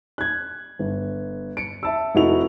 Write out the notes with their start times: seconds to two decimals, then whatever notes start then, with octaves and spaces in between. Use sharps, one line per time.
0.18 F#6 G#6
0.79 G1
1.57 C#7 D7
1.83 E5 A5 E6
2.15 F1 D#4 E4 F#4 A4 F7